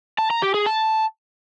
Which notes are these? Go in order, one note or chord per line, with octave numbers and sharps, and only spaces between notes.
A5
A#5
G4
G#4
A5